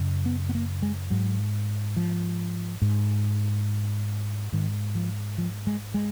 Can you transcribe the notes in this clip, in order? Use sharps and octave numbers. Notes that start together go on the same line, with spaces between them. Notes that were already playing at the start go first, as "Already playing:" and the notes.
Already playing: F#2 C#3
B3
B3
A#3
G#3
G#2 F#3
F3
G#2
G#2 D#3
F3
F3
G#3
G#3